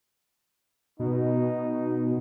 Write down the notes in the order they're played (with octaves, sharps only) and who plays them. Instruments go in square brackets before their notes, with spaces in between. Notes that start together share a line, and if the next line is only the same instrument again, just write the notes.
[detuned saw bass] B2 [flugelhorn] D#4